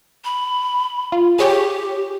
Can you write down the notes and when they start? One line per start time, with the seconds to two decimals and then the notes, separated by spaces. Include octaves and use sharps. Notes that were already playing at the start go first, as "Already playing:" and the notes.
0.24 B5
1.12 F4
1.39 G4 G#4 C#5 G5